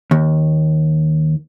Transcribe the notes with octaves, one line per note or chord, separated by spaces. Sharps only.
D#2